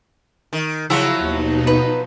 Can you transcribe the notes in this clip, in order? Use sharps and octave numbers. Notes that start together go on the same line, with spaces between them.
D#3
C#3 F3 F#3 E4 F#4 C#5
D#2 B2 D#4
B4